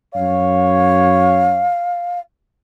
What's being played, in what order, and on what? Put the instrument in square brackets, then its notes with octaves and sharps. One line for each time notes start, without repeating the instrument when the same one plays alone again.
[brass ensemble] F#2 C#5 [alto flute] F5